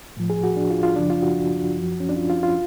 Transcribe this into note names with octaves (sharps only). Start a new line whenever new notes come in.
A2 F3
G#4
F#4
D4
F4
F4
F#2 C#3 F3 D4
F4
F#4
F#2 F3
C#4
D4
F4
F4
F4